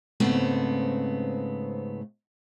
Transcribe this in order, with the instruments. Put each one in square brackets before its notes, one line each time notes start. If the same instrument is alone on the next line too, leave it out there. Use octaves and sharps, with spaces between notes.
[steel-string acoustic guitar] G#2 C#3 A3 B3 C4